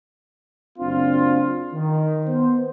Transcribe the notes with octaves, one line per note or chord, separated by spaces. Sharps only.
F#1 C4 D4 F4
D#3
B3 C5